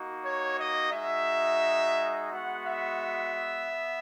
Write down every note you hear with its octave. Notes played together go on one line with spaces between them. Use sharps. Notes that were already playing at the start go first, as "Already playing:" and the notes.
Already playing: A#3 D#4 F#4
C#5
D#5
G#3 D#4 F#4 E5
G#3 B3 F#4 F#5
E5
B3